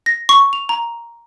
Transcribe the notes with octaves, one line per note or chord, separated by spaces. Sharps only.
A#6
C#6
F7
A#5